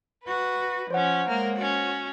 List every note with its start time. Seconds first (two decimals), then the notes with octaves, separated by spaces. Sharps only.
0.24 F#4 B4
0.91 F3 C#4 C5 C#5 F#5
1.28 G#3 A#3 A#4
1.57 C#4 F#4